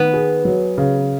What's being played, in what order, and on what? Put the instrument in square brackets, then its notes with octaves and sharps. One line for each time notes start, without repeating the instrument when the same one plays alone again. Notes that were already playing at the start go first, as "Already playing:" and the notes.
Already playing: [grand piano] D#3 [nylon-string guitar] B3
[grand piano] G#4
F#3
C#3